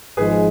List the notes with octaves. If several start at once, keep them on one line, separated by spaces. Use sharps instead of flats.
G#1 G#2 F3 G#3 G#4 B4